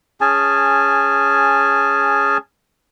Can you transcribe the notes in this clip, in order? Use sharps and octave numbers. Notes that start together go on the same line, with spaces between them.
C#4 G#4 G#5 A5